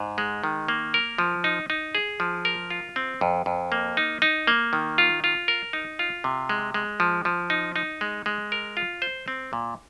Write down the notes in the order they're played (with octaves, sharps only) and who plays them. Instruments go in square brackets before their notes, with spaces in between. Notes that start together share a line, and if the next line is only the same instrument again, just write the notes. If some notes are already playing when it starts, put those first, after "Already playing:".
Already playing: [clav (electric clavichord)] G#2
G#3
D#3
A#3
A#4
F3
D#4
D#4
G#4
F3
A#4
F4
C4
F2
F2
A#3
D#4
D#4
A#3
D#3
F4
F4
A#4
D#4
F4
C3
G#3
G#3
F3
F3
D#4
D#4
G#3
G#3
A#4
F4
C5
C4
A#2